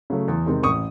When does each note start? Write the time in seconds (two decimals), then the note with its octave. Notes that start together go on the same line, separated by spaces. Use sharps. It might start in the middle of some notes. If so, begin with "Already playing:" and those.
0.10 C#3 F#3 A3
0.28 E2
0.46 C3 D#3 G#3 C4
0.63 A1 C#6 D#6